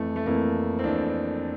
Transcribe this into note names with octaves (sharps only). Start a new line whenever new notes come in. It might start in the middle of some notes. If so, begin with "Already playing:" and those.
Already playing: F2 E3 A3
A3
F2 E3 A#3
C4
F2 E3 D4